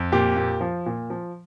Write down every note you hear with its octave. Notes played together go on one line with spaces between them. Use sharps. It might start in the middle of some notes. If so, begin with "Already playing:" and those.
Already playing: F2
A#2 G4
A#2
F3
A#2
F3